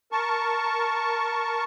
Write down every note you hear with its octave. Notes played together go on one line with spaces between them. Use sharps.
A#4 A5 C#6